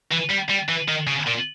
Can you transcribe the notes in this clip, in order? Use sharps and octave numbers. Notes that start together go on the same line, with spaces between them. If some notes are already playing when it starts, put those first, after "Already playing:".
E3
G3
G3
E3
D#3
C#3
A#2